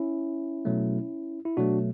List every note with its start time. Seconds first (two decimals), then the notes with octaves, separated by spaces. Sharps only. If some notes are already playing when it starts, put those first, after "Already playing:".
Already playing: C#4 E4
0.65 B2 F#3 A3
1.45 E4
1.57 B2 F#3 A3 D4 F#4